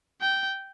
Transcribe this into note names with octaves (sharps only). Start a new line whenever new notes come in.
G5